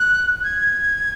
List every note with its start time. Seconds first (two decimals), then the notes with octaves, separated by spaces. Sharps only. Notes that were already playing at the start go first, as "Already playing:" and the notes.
Already playing: F#6
0.44 G#6